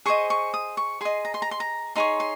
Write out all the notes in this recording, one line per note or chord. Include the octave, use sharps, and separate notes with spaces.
G#4 C5 D#5 C#6
C#6
D#6
C#6
G#4 D#5 C6
A#5
C6
A#5
C6
A#5
D#4 G#4 C#5 C6
C6